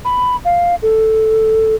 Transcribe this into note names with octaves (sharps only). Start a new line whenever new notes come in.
B5
F5
A4